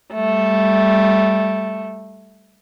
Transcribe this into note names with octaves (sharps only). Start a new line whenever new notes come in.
G3 A3